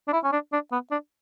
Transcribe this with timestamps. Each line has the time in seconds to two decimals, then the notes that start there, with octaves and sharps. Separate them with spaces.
0.08 D4
0.13 E4
0.24 C#4
0.32 D4
0.53 D4
0.72 B3
0.91 D4